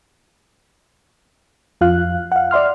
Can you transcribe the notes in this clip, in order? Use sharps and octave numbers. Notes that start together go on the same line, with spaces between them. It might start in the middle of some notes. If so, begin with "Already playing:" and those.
F2 F4 F5 F#6
F5 F#5
D5 E5 C6 F6